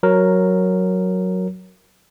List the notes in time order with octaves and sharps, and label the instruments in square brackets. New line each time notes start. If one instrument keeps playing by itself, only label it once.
[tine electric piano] F#3 A#4